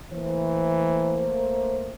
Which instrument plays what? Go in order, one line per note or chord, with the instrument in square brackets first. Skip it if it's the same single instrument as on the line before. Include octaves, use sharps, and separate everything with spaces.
[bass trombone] E3 [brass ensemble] A3 A#3 C5